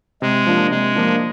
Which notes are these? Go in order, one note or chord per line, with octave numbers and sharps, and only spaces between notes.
C3 G#3
F3 A#3 D4 F4
C3 G#3
F3 A#3 D4 F4